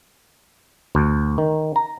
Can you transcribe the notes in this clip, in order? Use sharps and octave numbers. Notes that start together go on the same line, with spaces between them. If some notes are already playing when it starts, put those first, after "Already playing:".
D2
D#3
A#5